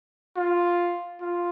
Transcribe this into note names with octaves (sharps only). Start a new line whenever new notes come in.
F4
F4